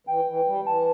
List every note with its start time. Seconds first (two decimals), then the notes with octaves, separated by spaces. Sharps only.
0.07 E3 G5
0.27 E3
0.47 G3
0.66 E3 A5